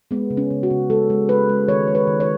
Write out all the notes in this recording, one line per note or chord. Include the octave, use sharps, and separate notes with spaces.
G#3 B3
C#3
C#4
C#3
F#4
C#3
G#3 A4
G#3
G#3 B4
G#3
D#3 C#5
G#3
B4
D#3
C#5